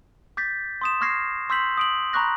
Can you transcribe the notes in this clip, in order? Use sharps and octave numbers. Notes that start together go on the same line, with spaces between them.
D6 G6 A6 B6
C6 D#6 E7
C#6 D6 F6 G#6 A#6 C7
C6 E6 G6 B6 F#7
D#6 D7 F#7
A#5 B5 C#6 D6 F#6 A#6